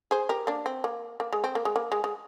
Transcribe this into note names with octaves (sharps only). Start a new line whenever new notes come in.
G#4 C5
G4 A#4
A#3 D4
C4
A#3
A#3
G#3
C4
A#3
G#3
A#3
G#3
G#3